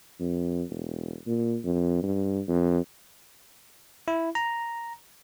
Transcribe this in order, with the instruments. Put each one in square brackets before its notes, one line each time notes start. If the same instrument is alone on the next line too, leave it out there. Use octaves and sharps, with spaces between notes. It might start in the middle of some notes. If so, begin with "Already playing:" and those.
[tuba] F2
E1
A#2
F2
G2
F2
[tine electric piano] E4
A#5